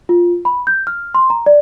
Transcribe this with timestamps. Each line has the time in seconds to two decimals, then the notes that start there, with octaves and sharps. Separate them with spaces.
0.09 F4
0.45 B5
0.67 G6
0.87 F6
1.14 C6
1.30 A#5
1.46 D5